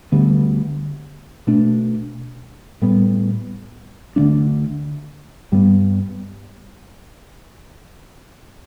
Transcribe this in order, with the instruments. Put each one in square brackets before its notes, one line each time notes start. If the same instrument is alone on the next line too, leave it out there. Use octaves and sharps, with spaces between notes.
[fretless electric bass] D2 D3 G3 B3
B2 A3 D4
A2 G3 B3
D2 D3 A3 D4
G2 G3 B3